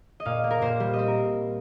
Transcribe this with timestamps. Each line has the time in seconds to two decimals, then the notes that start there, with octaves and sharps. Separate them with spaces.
0.20 D#5
0.25 A#2 F5
0.44 A#3
0.51 A#4
0.62 A#2 C5
0.80 G3
0.93 D#5
0.98 C4 C5
1.08 A#4